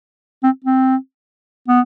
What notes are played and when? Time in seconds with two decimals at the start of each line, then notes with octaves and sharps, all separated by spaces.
0.43 C4
0.65 C4
1.68 B3